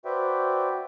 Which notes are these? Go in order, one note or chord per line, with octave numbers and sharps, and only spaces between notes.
F#4 B4 C5 D5 E5 G5